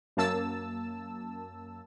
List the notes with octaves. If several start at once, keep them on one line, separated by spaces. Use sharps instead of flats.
F#2 A#3 A5 E6